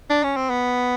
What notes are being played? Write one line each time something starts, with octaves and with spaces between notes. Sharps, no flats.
D4
C#4
C4
B3